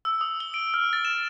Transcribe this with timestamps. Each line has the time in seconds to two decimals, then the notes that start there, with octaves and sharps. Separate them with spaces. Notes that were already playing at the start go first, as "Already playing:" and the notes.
0.05 E6
0.21 D#6
0.40 G7
0.54 D7
0.74 F6
0.93 A6
1.05 E7